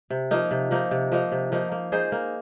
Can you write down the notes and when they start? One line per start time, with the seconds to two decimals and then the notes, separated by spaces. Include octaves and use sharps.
0.10 C3
0.31 F3 A#3 D#4
0.51 C3
0.71 F3 A#3 D#4
0.91 C3
1.12 F3 A#3 D#4
1.32 C3
1.52 F3 A#3 D#4
1.72 A#3
1.92 D#4 G#4 C5
2.12 A#3